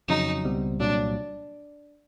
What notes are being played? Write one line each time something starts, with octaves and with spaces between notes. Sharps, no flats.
F2 C#3 F#3 D#4
C#2 B2 G3 C4
C2 A#2 F#3 D4